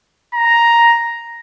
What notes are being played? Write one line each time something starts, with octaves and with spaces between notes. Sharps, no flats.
A#5